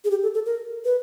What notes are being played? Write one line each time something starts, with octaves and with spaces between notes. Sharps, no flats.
G#4
G4
A4
A4
A#4
B4